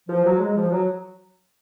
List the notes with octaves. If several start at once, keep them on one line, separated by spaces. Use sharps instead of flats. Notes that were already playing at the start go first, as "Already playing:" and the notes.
F3
F#3
G#3
F3
F#3